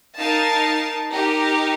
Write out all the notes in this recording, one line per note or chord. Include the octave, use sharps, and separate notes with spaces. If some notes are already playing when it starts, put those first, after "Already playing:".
D#4 A#4 F5 A5
D#4 G4 A#4